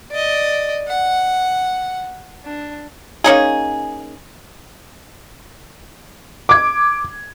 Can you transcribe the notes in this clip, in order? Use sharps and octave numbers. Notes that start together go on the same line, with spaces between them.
D5 D#5
F#5
D4
A#3 C#4 D#4 G#4
D6 G#6